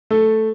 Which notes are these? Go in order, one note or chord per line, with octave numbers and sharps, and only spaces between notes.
A3 A4